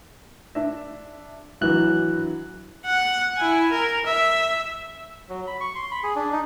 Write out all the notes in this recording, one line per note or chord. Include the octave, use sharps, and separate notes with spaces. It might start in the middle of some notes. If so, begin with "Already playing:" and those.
D4 E5
G#1 E3 F#3 D4 E4 F#6
F#5
E4 G#5
A#4
E5
F#3
B5
C#6
C6
B5
G#4
D4
D#4